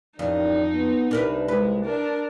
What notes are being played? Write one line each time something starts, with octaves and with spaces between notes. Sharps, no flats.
A1 F2 D#3 D#4 D5
B3
C2 D4 A#4 B4
G#3 B4
D4 A#4